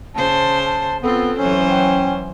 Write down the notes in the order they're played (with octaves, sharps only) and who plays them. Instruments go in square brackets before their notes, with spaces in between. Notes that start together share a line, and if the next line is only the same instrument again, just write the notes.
[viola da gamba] C#3 C5 [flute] A5
[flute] A5
[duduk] B3 [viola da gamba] C4 F4 [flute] A4
[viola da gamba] E3 F#3 C5 [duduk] C#4
[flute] G5